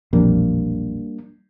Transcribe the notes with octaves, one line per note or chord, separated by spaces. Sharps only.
E1 A#1 F2 G3 A#3 D4